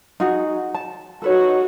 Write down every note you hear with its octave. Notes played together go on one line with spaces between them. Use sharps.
D#4 F#4 G#4
A5
D#4 F#4 A4 B4 C#5